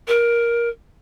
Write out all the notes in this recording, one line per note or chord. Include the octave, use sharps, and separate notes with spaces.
A#4